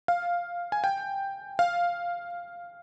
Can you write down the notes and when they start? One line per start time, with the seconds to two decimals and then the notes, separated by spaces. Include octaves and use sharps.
0.08 F5
0.72 G#5
0.84 G5
1.59 F5